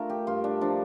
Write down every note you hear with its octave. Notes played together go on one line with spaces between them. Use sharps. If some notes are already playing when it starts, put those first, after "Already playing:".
Already playing: A3 D4 F4 A#4
G4
G2 F4
D4
F3 D4